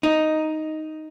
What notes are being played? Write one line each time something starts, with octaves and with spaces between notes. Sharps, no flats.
D#4